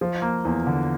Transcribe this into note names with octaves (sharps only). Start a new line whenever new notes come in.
F3
A#3
E2
D3